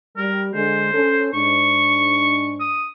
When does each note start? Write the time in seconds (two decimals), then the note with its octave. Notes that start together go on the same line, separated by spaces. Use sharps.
0.17 G3 A#4
0.54 D3 G#3 C5
0.94 C#4 A4
1.34 G#2 D4 C#6
2.60 D#6